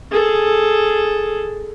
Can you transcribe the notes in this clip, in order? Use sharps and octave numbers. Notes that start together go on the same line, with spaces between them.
G#4 A4